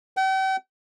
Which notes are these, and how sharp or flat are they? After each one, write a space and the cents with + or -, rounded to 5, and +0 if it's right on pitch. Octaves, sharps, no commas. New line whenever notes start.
G5 -45